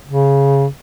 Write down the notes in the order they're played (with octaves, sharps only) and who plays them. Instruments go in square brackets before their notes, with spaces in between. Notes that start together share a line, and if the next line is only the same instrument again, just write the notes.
[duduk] C#3